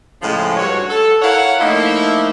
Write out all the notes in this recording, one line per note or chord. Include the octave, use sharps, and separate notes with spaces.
A2 C#3 F3 G#3
G2 F#4 C#5
A4
E4 A#4 C#5 F5 F#5
F3 A3 A#3 D#4 E4